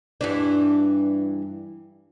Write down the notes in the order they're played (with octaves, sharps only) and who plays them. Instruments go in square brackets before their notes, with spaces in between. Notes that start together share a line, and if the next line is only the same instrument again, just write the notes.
[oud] G2 E3 D4